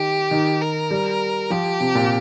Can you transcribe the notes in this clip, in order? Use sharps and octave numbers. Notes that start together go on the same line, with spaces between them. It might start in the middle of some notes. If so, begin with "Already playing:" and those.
Already playing: D#3 G4
D#3
A#4
G3
F3 G4
C3
A#2